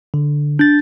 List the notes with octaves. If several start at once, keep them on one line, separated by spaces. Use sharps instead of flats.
D3
D4 G6 A6